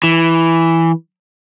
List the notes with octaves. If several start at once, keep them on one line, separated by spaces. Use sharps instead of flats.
E3